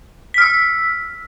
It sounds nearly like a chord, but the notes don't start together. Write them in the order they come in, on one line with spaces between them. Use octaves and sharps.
B6 F6 E6